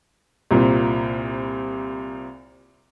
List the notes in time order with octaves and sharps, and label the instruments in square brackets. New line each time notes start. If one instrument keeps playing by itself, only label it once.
[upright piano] C2 A#2 C4